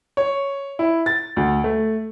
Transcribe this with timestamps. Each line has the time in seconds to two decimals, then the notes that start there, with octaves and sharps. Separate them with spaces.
0.17 C#5
0.79 E4
1.06 A6
1.37 D2
1.64 A3